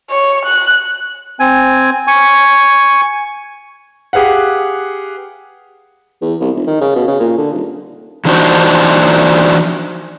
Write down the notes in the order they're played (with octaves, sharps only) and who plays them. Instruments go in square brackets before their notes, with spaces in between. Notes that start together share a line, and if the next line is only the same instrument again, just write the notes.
[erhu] C#5
F#6
[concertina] C4 G#5
G#5 C#6
[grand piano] G4 G#4 B4 F5 F#5
[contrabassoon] E2
C2
F1
D#3
C#3
B2
C#3
A#2
D3
D#1
[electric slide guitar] E3 F3 D4 D#4 F#4 C5